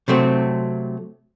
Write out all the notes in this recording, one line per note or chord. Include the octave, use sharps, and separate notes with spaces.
C3 F#3 A3 C4